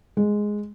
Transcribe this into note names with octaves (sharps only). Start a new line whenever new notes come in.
G#3